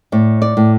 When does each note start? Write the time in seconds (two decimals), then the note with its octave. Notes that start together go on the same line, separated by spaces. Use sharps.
0.12 A2 D5
0.42 D5
0.57 A2